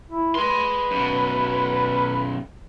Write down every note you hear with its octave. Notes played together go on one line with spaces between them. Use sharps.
E4
G#4 B4 C6
F#2 B2